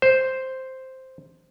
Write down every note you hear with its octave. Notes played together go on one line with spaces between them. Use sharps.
C5